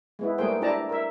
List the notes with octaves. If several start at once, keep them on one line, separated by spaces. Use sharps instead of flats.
G#3 B3 E4
G3 A3 A#3 G#4 C5 G5
D4 E4 G4 D5 A5 A#5
A#4 E5